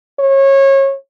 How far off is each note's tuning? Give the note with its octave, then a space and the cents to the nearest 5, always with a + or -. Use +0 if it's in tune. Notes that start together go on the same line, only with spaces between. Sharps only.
C#5 -25